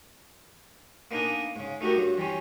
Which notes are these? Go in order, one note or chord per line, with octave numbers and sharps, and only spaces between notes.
A#3 B3 D4 D#4 A#4 G#5
G#2 C#3
A3 D#4 F#4 G4 A#4
G2 F#3
E3 G3 C4 C#4